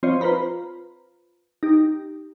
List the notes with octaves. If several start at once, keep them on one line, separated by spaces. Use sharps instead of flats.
F3 C4 F4 C5 C#5 D#5
F4 B4 C5 A#5 B5
D#4 G4